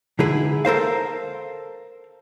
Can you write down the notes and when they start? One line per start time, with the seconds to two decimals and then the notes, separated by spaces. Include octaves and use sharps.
0.19 D3 G#3 D#4 E4 G#4 B4
0.65 A4 A#4 C5 F5